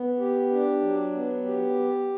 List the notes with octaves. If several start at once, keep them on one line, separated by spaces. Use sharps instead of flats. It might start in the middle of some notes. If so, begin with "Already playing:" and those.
Already playing: B3
G4
D4
F#3
B3
G4